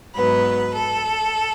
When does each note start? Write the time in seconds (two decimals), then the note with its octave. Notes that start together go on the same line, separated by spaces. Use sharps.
0.14 G#2 F#3 B3 B4
0.72 A4